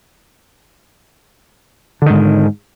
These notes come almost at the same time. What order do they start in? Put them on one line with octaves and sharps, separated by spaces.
D3 D#3 G#2